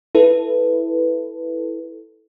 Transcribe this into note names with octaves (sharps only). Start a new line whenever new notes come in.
E4 A4 B4